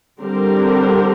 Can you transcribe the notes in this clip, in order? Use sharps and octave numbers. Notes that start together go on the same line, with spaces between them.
D3 G3 C4 G4 A#4